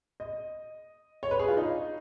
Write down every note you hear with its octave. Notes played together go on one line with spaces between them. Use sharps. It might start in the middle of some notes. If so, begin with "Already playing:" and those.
D#5
C#5
B4
G#4
F4
D#4